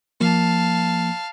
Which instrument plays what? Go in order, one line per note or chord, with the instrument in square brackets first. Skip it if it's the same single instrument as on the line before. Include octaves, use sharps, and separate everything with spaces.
[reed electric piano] F3 A#3 [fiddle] F5 A5